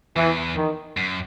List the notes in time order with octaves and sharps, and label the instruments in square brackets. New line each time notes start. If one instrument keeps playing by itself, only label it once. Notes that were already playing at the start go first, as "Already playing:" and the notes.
[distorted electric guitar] E2 [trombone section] E3
[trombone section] D#3
[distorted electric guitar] F#2